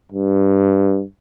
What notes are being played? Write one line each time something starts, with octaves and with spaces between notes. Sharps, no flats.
G2